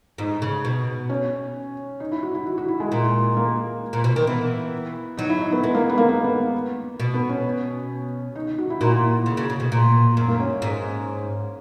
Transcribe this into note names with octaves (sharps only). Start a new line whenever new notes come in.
G#2 D#4
C#3
B2
C#4
D#4
E4
F#4
E4
F#4
F#4
E4
G#3
A#2
A#3
A#2
B2
D#3
E3 B3
F#3 D#4
E4
D#4
B3
G#3 B3
A#3
B3
A#3
A#3
B3
B2
B3
C#4
D#4
D#4
F#4
E4
A#2 F#4
C#3
C#3
C#3
B2
A#2
F#2
A#3
C#4
G#2